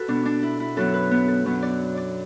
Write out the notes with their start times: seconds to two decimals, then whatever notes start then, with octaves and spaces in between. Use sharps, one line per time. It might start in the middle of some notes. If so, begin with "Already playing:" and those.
Already playing: F#4 A4 B4
0.08 B2 B3 D4
0.25 D4
0.43 E4
0.60 E4
0.76 F#2 F#3 B3 A4
0.94 B4
1.11 B3
1.28 A4
1.45 F#2 F#3 B3
1.62 D5
1.97 D5